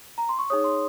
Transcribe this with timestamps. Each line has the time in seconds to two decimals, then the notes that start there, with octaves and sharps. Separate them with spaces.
0.18 A#5
0.29 C6
0.39 C#6
0.50 D#4 G#4 C#5 D#6
0.64 C6